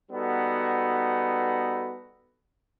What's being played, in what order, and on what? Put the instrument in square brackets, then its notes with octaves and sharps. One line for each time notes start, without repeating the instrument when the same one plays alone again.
[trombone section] G3 B3 D#4 F#4 A4